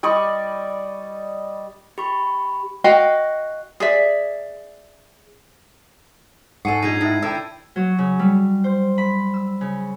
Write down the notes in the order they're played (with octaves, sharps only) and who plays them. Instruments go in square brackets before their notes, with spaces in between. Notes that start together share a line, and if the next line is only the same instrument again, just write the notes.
[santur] G3 D5 D#5 C#6
[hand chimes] G4 B5 C#6
[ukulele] F#4 D#5 F5 G5
G#4 D5 E5
[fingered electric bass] G#2 [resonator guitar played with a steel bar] A4 F#5 [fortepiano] G#5 C#6 [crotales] C7 D#7
[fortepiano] A#1 [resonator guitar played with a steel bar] D#4 G#4 [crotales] G#6 D#7
[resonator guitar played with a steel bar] A2 [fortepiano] D#4 E4
[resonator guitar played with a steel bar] D3 E4 [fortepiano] G5 E6
[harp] F#3
C#3
G3
C5
B5
E6
C#3